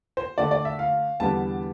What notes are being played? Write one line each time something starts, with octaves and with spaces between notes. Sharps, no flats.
C5
D3 A3 D4 D5
D5
E5
F5
E2 D3 G3 B3 D4 A5